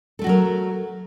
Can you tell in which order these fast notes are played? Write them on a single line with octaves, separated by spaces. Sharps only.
A4 A3 F#4 F#3 A#4